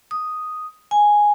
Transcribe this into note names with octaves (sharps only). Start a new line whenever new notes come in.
D#6
G#5